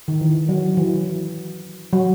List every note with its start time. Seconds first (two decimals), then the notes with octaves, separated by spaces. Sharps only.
0.08 D#3
0.21 E3
0.49 F#3
0.77 E3
1.93 F#3